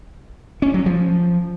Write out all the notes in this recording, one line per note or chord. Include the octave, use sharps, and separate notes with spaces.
C#4
F#3
F3